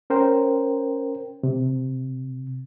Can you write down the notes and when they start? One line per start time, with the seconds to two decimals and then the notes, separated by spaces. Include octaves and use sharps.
0.10 C#4 A#4 C5 G5
1.43 C3